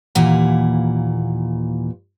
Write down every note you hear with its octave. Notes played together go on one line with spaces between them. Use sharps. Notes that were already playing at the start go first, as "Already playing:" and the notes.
D#2 A#2 E3 F#5